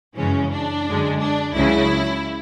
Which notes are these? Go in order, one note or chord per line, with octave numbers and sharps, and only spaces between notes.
F#2 C#3 E3 G#3 C#4
D4
F#2 D3 G#3
D4
C#2 C#3 F#3 E4